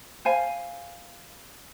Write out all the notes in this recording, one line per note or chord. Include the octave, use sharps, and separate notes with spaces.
C5 F5 G#5